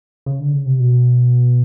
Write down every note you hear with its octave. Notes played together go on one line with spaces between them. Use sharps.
C#3
D3
C#3
C3
B2